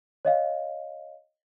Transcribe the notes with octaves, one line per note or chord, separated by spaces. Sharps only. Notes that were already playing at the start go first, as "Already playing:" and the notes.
C#5 D#5 F5